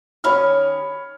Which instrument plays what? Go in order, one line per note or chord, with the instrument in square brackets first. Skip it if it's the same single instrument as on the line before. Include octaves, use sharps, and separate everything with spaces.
[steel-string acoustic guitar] D#3 C#4 G4 [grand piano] C#5 B5 F6